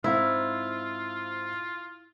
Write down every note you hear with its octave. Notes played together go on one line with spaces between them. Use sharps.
G#2 C4 E4 F4 F5